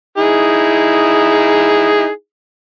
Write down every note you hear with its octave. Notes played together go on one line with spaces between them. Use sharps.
D#4 E4 G#4